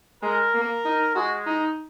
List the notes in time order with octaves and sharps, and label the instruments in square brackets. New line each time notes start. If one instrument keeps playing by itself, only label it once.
[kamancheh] G#3 [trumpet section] A#4
[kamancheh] A#3
D#4
[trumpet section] G#3 [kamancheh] F#4
[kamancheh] D#4